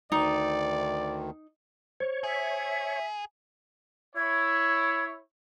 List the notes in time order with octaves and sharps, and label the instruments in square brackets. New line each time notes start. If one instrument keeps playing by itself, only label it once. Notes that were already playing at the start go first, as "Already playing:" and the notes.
[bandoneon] D2 D#3 [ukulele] D#4 [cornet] D5
[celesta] C5 [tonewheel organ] C#5
[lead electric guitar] G#4 [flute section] E5
[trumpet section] E4 C#5 [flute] G#6